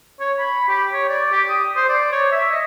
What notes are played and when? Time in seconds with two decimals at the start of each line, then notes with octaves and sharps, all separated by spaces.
0.20 C#5
0.39 B5
0.69 G4
0.93 C#5
1.09 D5
1.32 G4
1.49 D#6
1.76 C5
1.89 D5
2.12 C#5
2.32 E5
2.51 D#5